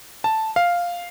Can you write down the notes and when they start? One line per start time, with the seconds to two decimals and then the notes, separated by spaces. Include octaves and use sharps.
0.24 A5
0.56 F5